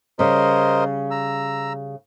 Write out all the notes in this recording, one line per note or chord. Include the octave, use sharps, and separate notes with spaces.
C#3 G3 A#4 C5 D#5
A#5 E6